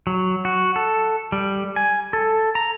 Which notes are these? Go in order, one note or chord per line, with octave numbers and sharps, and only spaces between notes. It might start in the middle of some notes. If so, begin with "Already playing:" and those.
F#3
F#4
A4
G3
G#5
A4
A#5